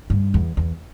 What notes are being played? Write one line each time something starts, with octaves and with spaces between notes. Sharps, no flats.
G2
E2
E2